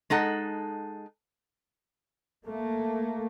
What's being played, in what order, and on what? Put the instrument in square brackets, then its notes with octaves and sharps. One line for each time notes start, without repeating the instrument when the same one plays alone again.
[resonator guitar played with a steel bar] G#3 D#4 A4 F#5
[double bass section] A3 A#3